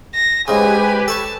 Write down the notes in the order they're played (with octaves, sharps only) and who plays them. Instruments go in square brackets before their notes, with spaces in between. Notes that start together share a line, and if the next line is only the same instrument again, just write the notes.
[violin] A#6
[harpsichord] G#2 C#3 [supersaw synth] G4 B4 [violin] G#5
[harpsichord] A4 C#5 C#6 [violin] A5